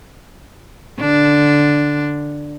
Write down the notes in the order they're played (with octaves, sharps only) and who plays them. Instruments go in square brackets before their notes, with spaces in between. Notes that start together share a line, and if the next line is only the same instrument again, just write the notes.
[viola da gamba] D3 D4